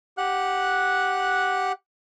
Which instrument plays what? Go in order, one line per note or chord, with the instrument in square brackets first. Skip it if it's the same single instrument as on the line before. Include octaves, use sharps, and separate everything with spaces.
[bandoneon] G4 F#5 F#6